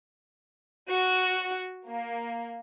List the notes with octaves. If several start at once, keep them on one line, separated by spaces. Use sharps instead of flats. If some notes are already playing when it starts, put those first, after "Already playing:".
F#4
A#3